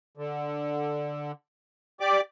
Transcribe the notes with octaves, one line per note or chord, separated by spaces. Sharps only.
D3
G4 D5 D6